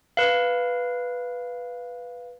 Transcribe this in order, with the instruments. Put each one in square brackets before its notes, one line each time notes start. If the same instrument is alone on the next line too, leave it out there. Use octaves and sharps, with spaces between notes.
[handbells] B4 F5